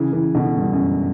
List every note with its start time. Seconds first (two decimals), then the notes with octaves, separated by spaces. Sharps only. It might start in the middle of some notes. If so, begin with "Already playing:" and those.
Already playing: C#3 E3
0.13 C#3 E3
0.35 B2 D3
0.56 G2
0.73 F#2